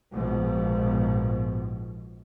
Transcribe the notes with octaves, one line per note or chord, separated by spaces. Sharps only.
A#1 G#2 B2 F3